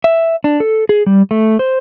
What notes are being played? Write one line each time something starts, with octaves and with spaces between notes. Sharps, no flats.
E5
D4
A4
G#4
G3
A3
C5